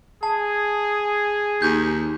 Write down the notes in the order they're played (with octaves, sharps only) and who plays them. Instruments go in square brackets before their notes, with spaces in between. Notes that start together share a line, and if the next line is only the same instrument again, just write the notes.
[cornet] G#4 [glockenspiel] A5
[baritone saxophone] D#2 [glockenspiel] G6